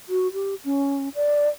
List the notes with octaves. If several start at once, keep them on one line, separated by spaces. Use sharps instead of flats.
F#4
G4
C#4
D5